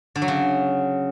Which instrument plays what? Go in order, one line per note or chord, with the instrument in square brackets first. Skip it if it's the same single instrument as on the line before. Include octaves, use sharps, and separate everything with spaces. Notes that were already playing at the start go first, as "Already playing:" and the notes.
[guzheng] D3
F#3
C#3